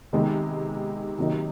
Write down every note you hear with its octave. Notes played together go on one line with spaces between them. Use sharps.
C3 D#3 G#3 B3 D#4
C3 D#3 F#3 A#3 D#4